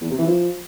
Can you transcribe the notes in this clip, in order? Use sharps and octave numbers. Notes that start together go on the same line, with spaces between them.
E2
C3
E3
F3